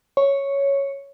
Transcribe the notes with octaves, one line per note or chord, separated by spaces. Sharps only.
C#5